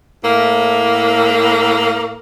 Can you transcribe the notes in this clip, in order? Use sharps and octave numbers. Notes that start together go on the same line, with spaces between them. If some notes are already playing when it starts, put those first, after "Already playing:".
A2 A#3